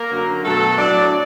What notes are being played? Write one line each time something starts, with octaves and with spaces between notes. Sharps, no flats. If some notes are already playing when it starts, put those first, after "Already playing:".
Already playing: A#3 A#4
F#2 D3 F#3
B2 F#3 A3 A4
A2 F#3 D4 D5